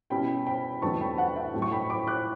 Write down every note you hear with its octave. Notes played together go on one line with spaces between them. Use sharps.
B2 G3 C#4 E4 G5 B5
G5 B5
E2 D3 F#3 A3 D4 A5 C#6
G5 B5
F#5 A5
E5 G5
A2 F#3 A3 E4
C#6
G5 B5
B5 D6
D6 F#6